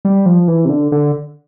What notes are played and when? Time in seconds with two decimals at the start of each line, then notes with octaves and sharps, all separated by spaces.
0.05 G3
0.26 F3
0.48 E3
0.65 C3
0.70 D3
0.92 D3